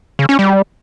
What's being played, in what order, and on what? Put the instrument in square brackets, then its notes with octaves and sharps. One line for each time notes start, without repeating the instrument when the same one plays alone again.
[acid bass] C#3
C#4
G3